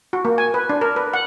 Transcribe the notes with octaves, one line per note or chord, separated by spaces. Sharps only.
F#4
A#3
G#5
B4
D4
A#4
B4
F#5